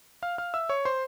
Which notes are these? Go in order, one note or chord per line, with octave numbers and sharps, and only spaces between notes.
F5 F6
F5 F6
E5 E6
C#5 C#6
C5 C6